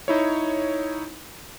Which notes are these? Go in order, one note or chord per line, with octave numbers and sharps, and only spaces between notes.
D#4 E4 C#5